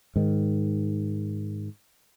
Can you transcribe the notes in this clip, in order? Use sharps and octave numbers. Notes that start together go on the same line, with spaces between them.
G#2 D#3